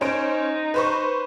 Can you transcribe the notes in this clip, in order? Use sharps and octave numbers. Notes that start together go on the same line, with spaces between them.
C#4 D#4 C5 D7
B4 C5 C#6